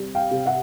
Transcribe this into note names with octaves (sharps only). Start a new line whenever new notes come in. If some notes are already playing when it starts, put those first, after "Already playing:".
Already playing: C3 G3
F5 G5
C3
E5 F#5